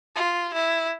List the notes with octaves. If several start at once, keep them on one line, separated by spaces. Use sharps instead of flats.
F4
E4